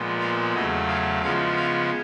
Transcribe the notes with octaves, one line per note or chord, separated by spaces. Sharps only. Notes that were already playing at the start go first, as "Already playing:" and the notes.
Already playing: A#2 F3 G#3 B3
F5
E2 C#3 F#3 A3 D#5
F5
C#3 F3 G#3 B3 F5
F5